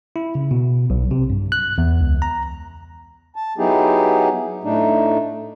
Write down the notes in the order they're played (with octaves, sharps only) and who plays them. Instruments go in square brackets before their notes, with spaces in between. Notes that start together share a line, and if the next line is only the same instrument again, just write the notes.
[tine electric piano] E4
C#3
B2
B1
C3
G2
F#6
E2
C#2
A#5
[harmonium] A5
F#3 B3 D#4 E4 G4 G#4
A2 A3 D4 D#4